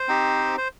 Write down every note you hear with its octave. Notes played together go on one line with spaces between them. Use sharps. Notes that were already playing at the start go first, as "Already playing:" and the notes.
Already playing: C5
C4 D#4 G4
C5